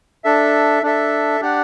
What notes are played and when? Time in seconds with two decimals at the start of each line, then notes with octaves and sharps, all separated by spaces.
0.24 D4 A4 E5
0.83 D4 A4 E5
1.41 D4 G4 D5 F#5